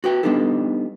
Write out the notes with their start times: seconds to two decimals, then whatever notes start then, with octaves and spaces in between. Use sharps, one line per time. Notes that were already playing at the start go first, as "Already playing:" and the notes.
0.04 F#4 B4 G5
0.23 G3 B3 D4 D#4 G4 A4